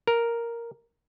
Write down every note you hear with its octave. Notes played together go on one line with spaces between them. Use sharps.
A#4